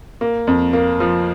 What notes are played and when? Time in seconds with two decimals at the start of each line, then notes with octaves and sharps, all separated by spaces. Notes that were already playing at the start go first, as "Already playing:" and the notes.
0.21 A#3
0.47 F2
0.73 A#3
1.00 F3